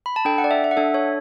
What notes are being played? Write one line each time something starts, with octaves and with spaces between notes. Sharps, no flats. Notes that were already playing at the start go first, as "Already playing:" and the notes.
B5
A5
D4 A4 G5
F#5
D5
E5
E5
F#5
D4 A4 E5
C#5